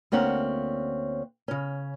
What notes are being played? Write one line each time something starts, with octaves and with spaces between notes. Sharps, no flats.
D2 A#3 C4 C#4 F#5
C#3 C#4